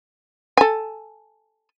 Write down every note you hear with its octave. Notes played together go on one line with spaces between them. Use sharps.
A4 G#5